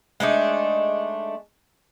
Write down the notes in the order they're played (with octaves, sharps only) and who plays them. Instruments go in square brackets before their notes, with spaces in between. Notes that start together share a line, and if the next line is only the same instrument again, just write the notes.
[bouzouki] G#3 A3 D4 D#4